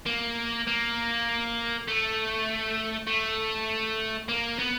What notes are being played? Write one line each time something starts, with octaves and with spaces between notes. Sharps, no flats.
A#3
A#3
A3
A3
A#3
B3